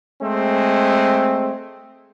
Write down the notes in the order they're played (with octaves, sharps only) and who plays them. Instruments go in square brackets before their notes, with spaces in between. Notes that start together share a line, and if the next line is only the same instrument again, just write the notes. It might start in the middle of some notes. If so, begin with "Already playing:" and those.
[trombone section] G#3 A3 C4